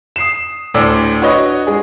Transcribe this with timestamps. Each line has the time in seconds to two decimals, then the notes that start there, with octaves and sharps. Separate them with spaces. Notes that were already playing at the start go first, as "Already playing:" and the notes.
0.16 D#6 C7 E7
0.74 D2 A2 A4 D5 D6 E6
1.21 D4 F#4 B4 C#5 D#5
1.67 G#3 G#4